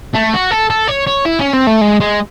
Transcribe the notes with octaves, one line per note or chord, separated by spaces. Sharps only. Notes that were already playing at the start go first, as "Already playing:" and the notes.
A3
F#4
A4
A4
C#5
C#5
E4
C#4
C4
A3
G#3
G#3